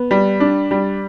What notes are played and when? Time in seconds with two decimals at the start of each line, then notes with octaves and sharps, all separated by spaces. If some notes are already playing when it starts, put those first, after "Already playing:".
Already playing: B3
0.11 G3
0.40 D4
0.71 G3